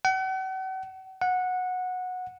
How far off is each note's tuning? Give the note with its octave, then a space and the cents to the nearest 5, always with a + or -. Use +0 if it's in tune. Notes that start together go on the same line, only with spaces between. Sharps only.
F#5 +40
F#5 -15